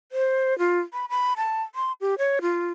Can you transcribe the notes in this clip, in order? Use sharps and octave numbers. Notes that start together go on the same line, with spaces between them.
C5
F4
B5
B5
A5
C6
G4
C#5
F4